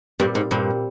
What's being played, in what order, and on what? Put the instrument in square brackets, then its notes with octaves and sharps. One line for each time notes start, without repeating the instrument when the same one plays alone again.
[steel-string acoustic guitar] G2 [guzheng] A#2 G3 C4
[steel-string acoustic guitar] G#2
[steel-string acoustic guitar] G2 [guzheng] A#2 G3 C4